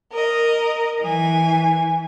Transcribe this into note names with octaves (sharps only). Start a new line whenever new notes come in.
A#4 D#5
E3 G#5